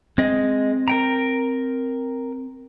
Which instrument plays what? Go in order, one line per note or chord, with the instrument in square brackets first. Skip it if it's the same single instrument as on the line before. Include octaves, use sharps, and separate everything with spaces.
[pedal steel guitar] G#3 D#5 [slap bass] C4
[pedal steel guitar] A#4 G5 A#5